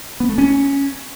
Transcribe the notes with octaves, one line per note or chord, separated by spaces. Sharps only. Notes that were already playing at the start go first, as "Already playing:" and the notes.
B3
A3
C#4